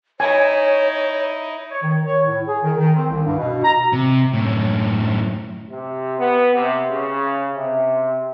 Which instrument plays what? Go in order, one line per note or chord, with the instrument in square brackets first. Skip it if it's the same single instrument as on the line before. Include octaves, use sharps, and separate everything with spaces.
[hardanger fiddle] D#4 E4 [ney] C#5 [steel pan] G#5
[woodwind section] C#5
D#3
C#5
A2
G#4
D#3
D#3
C4
C2
G2
B2
A#5
[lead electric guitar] C3
F#2 A2
[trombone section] C3
B3
C3
C#3
C3